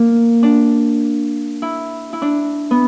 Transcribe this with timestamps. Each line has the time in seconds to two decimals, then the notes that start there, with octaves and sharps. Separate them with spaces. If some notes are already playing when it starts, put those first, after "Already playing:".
Already playing: A#3
0.43 D4
1.62 E4
2.13 E4
2.22 D4
2.71 B3